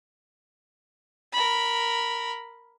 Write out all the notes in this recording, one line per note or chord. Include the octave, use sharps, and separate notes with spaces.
A#4 B5